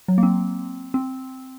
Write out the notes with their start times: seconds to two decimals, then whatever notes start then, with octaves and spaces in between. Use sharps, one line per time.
0.08 F#3
0.18 A#3
0.23 C4
0.94 C4